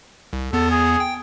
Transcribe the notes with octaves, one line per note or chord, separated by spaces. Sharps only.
C2
E2 B3 A4
G#4
G5